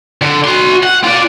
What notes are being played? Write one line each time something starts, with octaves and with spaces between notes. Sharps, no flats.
D3
F#4 C6
F#5
F4 D5